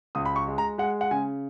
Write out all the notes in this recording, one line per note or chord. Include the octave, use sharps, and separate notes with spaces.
C#2 D#6
B5
C#6
G#3
A#5
G#3 F#5
F#5
C#3 G#5